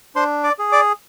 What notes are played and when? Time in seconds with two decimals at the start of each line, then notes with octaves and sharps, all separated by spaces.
0.15 D4 C5 C6
0.44 D5 D6
0.59 G#4
0.72 D5 D6